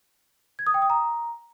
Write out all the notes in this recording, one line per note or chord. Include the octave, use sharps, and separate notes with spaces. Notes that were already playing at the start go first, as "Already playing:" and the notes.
G#6
D#6
G5
D#6
A#5